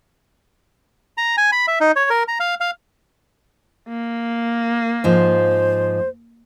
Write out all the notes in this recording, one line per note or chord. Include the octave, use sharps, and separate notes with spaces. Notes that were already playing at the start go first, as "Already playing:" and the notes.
A#5
G#5
B5
E5
D#4
C#5
A#4
A#5
F5
F5
A#3
G#2 F3 C5